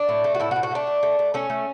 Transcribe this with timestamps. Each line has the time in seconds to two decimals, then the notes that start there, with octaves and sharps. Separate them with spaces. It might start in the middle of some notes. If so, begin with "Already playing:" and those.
Already playing: D4
0.09 A2
0.24 A3
0.35 F#4
0.40 A2 E4
0.51 F#4
0.56 A2
0.63 F#4
0.71 A3 D4
0.87 A3
1.03 A3
1.19 A3
1.34 A3 C#4
1.50 A3